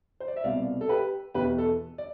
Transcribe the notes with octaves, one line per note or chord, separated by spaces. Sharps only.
C5
D5
E5
C2 B2 D5 F5
A4
G4 B4
E2 B2 G4 B4
A4
D5